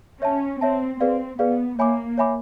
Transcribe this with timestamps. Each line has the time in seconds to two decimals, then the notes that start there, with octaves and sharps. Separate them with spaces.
0.21 C#4 C#5 E5 A5
0.61 C4 C#5 E5 A5
1.00 C4 G#4 B4 D5 F5
1.39 B3 G#4 B4 D5 F5
1.79 A#3 C#5 E5 G#5 B5 D6
2.18 C#5 E5 G#5 B5 D6